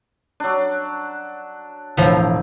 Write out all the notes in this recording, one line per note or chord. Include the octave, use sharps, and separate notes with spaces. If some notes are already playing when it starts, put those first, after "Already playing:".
F#3 D4
E1 A2 F3